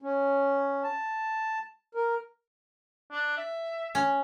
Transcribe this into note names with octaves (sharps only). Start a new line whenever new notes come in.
C#4
A5
A#4
D4
E5
C#4